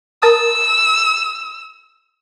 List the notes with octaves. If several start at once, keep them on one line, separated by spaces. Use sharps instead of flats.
A#4 A5 D#6 E6